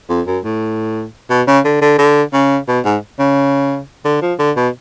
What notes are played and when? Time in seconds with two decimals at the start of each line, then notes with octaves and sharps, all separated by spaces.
0.09 F2
0.27 F#2
0.44 A2
1.30 B2
1.47 C#3
1.65 D3
1.81 D3
1.98 D3
2.33 C#3
2.68 B2
2.85 G#2
3.19 C#3
4.05 D3
4.22 F3
4.39 D3
4.56 B2